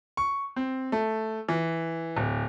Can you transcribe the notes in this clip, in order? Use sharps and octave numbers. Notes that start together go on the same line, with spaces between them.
C#6
C4
A3
E3
D1